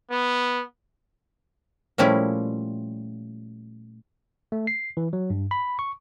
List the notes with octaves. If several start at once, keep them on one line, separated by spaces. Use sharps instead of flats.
B3
A#2 F3 G3 A3 C#4 E4
A3
C7
E3
F#3
G2
B5
C#6